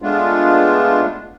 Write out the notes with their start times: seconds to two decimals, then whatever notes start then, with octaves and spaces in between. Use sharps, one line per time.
0.02 G#3 A3 B3 D4 F4